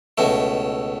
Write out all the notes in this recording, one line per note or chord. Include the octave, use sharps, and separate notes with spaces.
C#2 B2 A3 E4